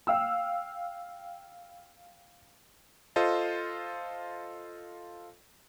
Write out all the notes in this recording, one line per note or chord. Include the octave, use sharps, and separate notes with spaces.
F5 G5 E6
F4 A4 C5 D#5